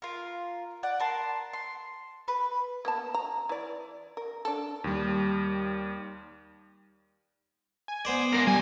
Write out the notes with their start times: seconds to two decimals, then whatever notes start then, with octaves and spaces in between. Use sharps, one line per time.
0.02 F4 A#4
0.83 D5 F#5
1.00 A#4 A5 C6
1.53 C6
2.28 B4
2.85 A#3 B3 A5
3.14 A#5
3.49 E3 D5
4.17 A#4
4.45 D4 A4
4.84 D#2 G3
7.88 G#5
8.05 B3 C5 D5
8.33 G#3 A#4 C6
8.47 B1 G3 G#5